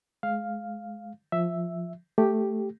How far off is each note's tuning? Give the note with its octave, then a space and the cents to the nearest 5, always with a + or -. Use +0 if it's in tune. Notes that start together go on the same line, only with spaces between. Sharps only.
G#3 +25 F5 +0
F3 +0 E5 +0
A3 +0 G4 +0